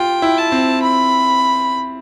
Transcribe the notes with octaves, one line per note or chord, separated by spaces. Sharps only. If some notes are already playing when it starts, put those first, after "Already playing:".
Already playing: F4 G4 G5
E4
A5
C4
B5